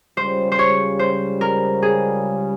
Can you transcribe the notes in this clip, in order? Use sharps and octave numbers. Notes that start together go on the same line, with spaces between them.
C#2 C#3 G3 C5
C5
C#5
C5
A#4
G#4